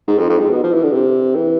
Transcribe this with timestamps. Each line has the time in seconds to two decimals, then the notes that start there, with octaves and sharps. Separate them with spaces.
0.08 G#2
0.19 F2
0.29 F2
0.39 G#2
0.51 B2
0.63 F3
0.74 E3
0.83 D3
0.93 C3
1.35 E3